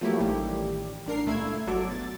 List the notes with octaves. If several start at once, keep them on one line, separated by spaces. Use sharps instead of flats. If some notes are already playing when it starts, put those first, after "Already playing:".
F3 F#3 A3 A#3 E4 G4
A1 A2 D#3 G3 G4
A1 D4 A#4 C7
C#2 A#2 A3 E4 E6 G#6
G1 F#3 A4 D6
B2 A6